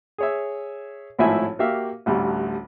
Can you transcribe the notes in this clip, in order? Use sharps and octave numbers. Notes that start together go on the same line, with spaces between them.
G#4 C#5 E5
G#1 A2 F3 E4 E5 G#5
A#3 F#4 G4 E5 F5
A1 D2 G3